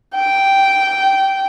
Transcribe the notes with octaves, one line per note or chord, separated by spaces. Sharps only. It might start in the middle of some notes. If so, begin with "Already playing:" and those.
G5